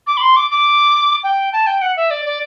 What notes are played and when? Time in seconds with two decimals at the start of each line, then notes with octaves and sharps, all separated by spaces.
0.07 D6
0.17 B5
0.22 C6
0.36 D6
0.51 D6
1.23 G5
1.53 A5
1.67 G5
1.82 F#5
1.97 E5
2.11 D5
2.26 D5